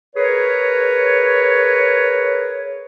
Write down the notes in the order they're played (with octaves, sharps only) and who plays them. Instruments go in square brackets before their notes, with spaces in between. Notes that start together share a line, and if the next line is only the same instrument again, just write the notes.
[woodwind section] G#4 A#4 B4 C#5